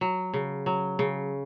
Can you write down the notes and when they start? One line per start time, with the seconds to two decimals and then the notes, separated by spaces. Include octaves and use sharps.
0.01 F#3
0.34 C#3
0.66 F#3
0.99 C#3